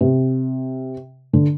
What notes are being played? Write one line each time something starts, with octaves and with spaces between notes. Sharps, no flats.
C3
D3